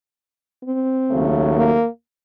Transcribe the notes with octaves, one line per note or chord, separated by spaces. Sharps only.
C4
D#2 C#3 F#3 A3
A#3